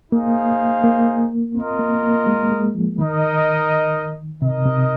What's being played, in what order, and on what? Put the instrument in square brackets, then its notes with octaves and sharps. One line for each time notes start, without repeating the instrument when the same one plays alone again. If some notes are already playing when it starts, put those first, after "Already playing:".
[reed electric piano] A#3 [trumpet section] D#4 G#4 C5 F5
[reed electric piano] A#3
[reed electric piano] C4 [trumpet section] F4 A#4 D#5
[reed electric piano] A#3
A#3
G#3
G#3
F3
[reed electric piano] D#3 [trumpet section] D#4 A#4 D#5
[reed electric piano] C3 [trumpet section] D#4 A#4 D#5
[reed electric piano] C3